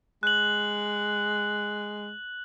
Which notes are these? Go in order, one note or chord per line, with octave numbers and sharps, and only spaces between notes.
G#3 F#6 F#7